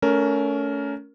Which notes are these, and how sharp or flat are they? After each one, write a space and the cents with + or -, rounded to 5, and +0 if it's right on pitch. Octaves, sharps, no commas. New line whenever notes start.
A3 +0 C#4 +25 A#4 +0